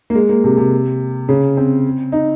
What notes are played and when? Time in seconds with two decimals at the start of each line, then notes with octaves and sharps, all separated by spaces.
0.10 A#3
0.15 G#3
0.29 A#3
0.44 C3
0.57 C3
1.29 C#3
1.57 C4
2.12 D#4